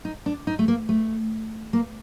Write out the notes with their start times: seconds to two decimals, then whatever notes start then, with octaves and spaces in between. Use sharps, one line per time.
0.05 D#4
0.26 D4
0.47 D#4
0.59 A3
0.68 A#3
0.89 A3
1.73 A#3